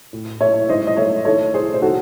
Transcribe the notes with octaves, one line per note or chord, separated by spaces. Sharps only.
A2
A3 C#5 E5
G#2 C5 D#5
D#5
A3 C#5 E5
D#3 A4 C#5
C2 G#4 C5
C5
D#3 F#4 A4